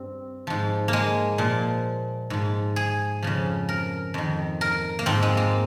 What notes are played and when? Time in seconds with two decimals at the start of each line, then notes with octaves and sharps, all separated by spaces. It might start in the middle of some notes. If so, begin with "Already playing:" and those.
Already playing: G2 C4
0.47 G#2 F3
0.88 G#3 A#3
1.38 A#2 F3
2.30 G#2 F3
2.76 G#4
3.22 F2 C#3 F3
3.69 A#4
4.14 F2 D#3
4.61 A#4
4.99 A#3
5.06 G#2 F3 C4
5.23 G#3
5.37 A#3